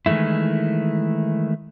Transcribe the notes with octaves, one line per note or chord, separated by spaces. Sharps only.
D#3 E3 G#3 A3 E4